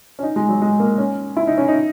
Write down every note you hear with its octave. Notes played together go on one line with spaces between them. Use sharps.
C#4
D#4
G#3
F#3
G#3
A#3
C#4
E4
D#4
C#4
D#4